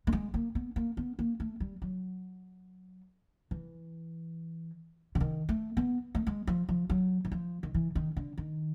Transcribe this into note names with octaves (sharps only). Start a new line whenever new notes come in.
A3
G#3
A#3
B3
A#3
B3
A#3
A3
G3
F#3
E3
D3
D#3
A3
B3
A3
G#3
F3
F3
F#3
E3
F3
D#3
E3
D#3
D3
D#3